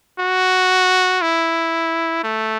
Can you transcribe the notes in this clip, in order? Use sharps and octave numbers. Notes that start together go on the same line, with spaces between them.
F#4
E4
A3